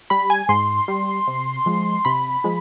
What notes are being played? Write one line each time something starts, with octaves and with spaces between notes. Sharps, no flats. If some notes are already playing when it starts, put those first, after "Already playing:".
G3 B5
G#5
G#2 C6
G3
C3
F3 G#3
C3 B5
F3 G#3